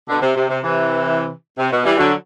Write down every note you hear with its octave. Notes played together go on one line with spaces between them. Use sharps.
B2 D3
C3
C3
C3
C3 E3
C3
B2
E3 G3
D3 F#3